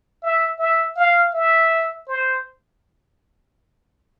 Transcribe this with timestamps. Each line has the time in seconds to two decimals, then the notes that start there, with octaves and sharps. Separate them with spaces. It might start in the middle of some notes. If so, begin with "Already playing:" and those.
0.23 E5
0.59 E5
0.96 F5
1.34 E5
2.08 C5